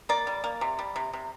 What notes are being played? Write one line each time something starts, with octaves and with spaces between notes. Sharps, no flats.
A#3 D5
G3
A#3
C3
G3
C3
C3